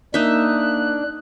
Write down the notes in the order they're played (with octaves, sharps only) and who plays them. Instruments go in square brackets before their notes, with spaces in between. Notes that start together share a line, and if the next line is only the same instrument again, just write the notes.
[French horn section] A#3 [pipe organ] D4 [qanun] D#4 E5 [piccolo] F#6